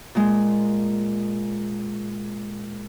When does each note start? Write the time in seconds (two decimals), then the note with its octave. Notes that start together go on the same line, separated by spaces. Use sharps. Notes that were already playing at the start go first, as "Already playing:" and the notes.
0.15 A#2 G#3